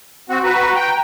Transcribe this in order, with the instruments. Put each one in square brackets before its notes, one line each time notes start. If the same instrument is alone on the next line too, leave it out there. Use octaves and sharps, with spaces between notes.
[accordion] C4 F#4
[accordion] F#4 B4 [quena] A#5
[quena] A#5
[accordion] G5